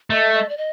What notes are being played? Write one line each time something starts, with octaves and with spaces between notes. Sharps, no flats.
A3 D#5
D#5
D5
D#5